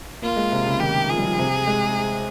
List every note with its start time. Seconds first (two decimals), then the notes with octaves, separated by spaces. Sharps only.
0.22 A#3 F4
0.36 G#3
0.52 C3
0.66 C#3
0.80 D#3 G4
1.09 F3 G#4
1.18 G3
1.25 F3
1.39 C3
1.67 G#3